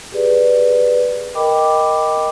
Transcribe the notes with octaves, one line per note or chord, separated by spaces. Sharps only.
G4 G#4 B4 D5
A#4 D#5 G5 B5 D6